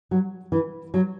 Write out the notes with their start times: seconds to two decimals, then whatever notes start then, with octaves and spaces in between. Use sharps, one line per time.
0.11 F#3
0.52 E3
0.94 F#3